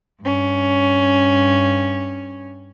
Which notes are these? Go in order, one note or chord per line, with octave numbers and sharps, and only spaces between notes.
G2 C#4